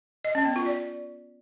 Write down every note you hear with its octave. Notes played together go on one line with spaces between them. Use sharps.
D#5
C#4
B3
F4
D5